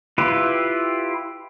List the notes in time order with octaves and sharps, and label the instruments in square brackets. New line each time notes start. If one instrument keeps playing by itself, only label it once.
[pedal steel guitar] E4 F4 G4 B4